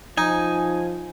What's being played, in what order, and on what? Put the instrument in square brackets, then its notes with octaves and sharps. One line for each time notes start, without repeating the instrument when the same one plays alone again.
[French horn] F3 [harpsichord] D#4 [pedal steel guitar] G#5